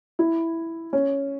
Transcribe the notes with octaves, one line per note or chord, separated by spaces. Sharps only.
E4
C#4